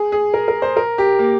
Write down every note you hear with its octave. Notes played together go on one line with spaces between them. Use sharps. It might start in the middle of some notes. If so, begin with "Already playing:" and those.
Already playing: G#4
G#4
A#4
A#4
C5
A#4
G4
A#3